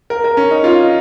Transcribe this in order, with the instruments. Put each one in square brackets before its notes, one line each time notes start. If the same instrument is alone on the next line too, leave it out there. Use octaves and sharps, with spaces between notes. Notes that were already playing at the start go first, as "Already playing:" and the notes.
[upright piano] A#4
A#4
C#4
D#4
F4